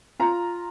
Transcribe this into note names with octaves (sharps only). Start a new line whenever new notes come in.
F4 A#5